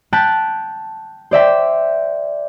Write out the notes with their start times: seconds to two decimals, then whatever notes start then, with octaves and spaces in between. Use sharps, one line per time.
0.13 G5 A5 F#6 A6 B6 D7
1.31 C5 D5 E5 G5